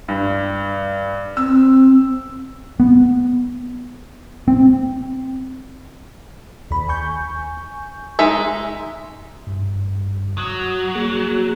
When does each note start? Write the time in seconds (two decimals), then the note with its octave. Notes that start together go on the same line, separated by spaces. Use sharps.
0.08 G2
1.37 C4 E6
2.80 B3
4.48 C4
6.71 D#2 B5
6.89 G#5 C#6 G6
8.19 G#3 D#4 E5
9.47 G2
10.38 F#3 D#6
10.95 A#3 G#4